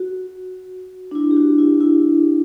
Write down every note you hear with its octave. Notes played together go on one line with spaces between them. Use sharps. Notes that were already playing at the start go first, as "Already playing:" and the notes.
Already playing: F#4
D4
E4
G4
F#4
E4
E4